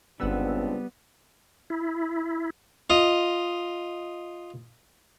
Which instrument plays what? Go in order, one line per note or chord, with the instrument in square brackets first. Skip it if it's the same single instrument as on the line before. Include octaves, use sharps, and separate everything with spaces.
[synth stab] G1 F#5 E6 [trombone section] C#2 C4 D4 [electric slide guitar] G3 B3
[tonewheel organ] E4
[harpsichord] F4 D#5